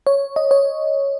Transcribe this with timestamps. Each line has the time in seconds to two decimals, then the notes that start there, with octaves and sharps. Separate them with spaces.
0.07 C#5
0.36 D#5
0.51 C#5